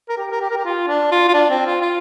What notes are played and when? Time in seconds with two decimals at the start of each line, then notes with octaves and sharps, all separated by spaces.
0.09 A#4
0.17 G4
0.31 A#4
0.41 G4
0.50 A#4
0.57 G4
0.65 F4
0.88 D4
1.11 F4
1.28 F4
1.34 D4
1.50 C4
1.66 F4
1.81 F4